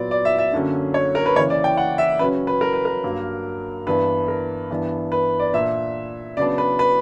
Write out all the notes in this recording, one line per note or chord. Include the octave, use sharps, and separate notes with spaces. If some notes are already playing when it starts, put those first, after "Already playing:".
Already playing: A#2 F#3 B3 D5
D5
E5
E5
F#2 D3 F#3 A#3 C#4
C#5
A#4
B4
C#3 E3 A#3 C#5
D5
G5
F#5
E5
C#3 F#3 C#4 B4
B4
A#4
B4
A#4
G2 F#3 A#3
G2 E3 B3 D4 B4
A#4
G2 E3 B3 D4
B4
D5
A#2 A#3 D4 E5
C#3 F#3 B3 D4 D5
B4
B4